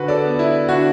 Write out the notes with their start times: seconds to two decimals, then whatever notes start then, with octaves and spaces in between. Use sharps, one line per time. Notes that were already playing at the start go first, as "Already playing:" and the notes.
Already playing: D3 F#4 B4
0.08 A4 D5
0.24 B3
0.39 E4
0.69 D3 D4 F#4